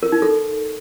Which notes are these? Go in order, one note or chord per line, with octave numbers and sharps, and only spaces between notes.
A#4
D#4
A4